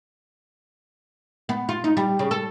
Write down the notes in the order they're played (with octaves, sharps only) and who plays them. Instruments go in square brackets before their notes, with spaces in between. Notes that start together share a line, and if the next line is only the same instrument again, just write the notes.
[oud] B3
F4
D#4
G3
C#3
A4